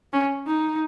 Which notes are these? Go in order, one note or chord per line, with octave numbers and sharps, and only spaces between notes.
C#4
D#4